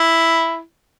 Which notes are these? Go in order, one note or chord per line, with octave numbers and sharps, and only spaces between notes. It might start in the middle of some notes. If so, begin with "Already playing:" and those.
Already playing: E4